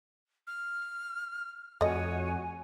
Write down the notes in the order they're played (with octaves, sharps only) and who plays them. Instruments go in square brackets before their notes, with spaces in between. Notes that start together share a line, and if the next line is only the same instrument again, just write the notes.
[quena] F6
[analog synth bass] F2 [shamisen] A3 D#5 [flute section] F#4 G#5 [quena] C#5